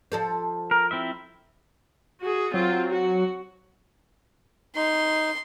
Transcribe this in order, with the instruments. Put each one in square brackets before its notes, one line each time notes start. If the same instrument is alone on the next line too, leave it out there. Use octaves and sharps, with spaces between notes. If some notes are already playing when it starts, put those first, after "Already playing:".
[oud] F3 A4 C5
[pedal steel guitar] A#4
C4 E4 E5
[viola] F#4 G#4
[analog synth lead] F#3 [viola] C4 F4
[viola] F#4
[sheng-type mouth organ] D#4 [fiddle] C6